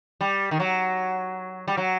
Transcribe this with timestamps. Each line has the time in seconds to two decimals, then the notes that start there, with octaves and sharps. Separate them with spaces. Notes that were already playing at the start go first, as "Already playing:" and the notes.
0.21 G3
0.51 D#3
0.60 F#3
1.68 G3
1.77 F#3